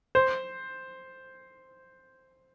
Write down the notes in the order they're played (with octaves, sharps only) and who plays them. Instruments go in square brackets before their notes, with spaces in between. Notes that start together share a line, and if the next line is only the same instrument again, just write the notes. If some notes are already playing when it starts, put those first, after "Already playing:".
[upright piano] C5